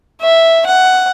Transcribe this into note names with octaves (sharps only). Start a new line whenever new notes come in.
E5
F#5